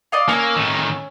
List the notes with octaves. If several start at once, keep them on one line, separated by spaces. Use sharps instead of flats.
D5 D#5 F5
A#3 C#4 C#5 E6
A2 D#3